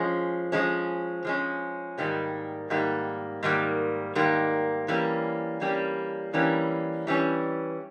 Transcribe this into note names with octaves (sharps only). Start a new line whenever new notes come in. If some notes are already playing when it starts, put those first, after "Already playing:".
Already playing: F3 G#3 C#4
F3 G#3 C#4
F3 G#3 C#4
G#2 D#3 G3 A#3
G#2 D#3 G3 A#3
G#2 D#3 G3 A#3
G#2 D#3 G3 A#3
E3 G3 A#3 C#4
E3 G3 A#3 C#4
E3 G3 A#3 C#4
E3 G3 A#3 C#4